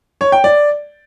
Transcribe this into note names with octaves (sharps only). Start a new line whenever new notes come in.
C#5
G5
D5